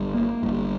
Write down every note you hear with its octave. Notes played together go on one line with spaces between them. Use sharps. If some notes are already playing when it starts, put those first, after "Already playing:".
Already playing: G1 G2
A#3
G1 G2